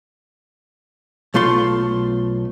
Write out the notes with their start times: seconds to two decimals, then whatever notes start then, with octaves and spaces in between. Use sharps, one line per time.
1.34 B1 A3 F4 C6